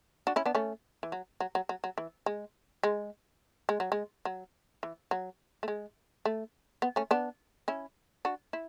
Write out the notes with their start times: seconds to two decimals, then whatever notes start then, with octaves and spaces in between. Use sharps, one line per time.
0.27 D4 F#4
0.36 C#4 E4
0.46 B3 D4
0.55 A3 C#4
1.03 E3
1.12 F#3
1.40 F#3
1.55 F#3
1.69 F#3
1.84 F#3
1.98 E3
2.26 G#3
2.83 G#3
3.69 G#3
3.80 F#3
3.92 G#3
4.25 F#3
4.83 E3
5.11 F#3
5.63 A3
5.68 G#3
6.25 A3
6.82 B3
6.96 A3 C#4
7.11 B3 D4
7.68 C#4 E4
8.25 D4 F#4
8.53 E4